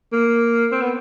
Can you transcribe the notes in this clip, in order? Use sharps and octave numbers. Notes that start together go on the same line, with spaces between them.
A#3
C4
B3